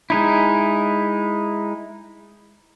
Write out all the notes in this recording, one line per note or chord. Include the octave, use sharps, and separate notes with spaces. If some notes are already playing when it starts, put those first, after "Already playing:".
G#3 D#4 E4